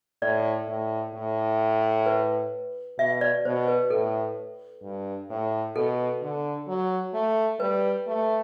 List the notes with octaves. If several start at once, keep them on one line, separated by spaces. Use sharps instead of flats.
A2 D5
A2
A2
B4
B2 E5
D5
B2 C5
B4
A2 A4
G2
A2
B2 A4
D3
F#3
A3
G3 B4
A3